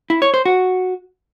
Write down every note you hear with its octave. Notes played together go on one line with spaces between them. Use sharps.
E4
C#5
C5
F#4